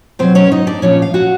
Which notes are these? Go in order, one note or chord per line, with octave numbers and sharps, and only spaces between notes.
B2 F#3 C4 C5
C#4 C#5
D#4 D#5
D4 D5
A#2 F3 C#4 C#5
F5
F#4 F#5